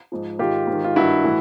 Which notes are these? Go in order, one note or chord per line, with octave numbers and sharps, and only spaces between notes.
G#2 F3
G#2 D#3 F4 G4
G#2
D#3
F4
G2 D#3 E4 F#4
A2 E3